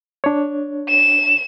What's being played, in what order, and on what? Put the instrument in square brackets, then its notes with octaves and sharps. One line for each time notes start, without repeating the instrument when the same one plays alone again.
[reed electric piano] D4 C#5
[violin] E7